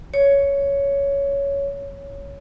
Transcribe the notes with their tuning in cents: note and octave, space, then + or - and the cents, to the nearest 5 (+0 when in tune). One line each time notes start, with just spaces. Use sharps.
C#5 +10